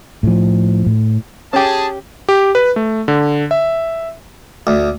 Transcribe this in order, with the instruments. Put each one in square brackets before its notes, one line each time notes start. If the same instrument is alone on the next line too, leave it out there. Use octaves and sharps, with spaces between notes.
[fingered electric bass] A2 F3
A2
[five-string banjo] C#4 G4 [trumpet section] G#4 A5
[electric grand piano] G4
B4
A3
D3
E5
[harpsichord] D2